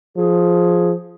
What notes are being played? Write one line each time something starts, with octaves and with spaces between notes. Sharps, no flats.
F3 G#4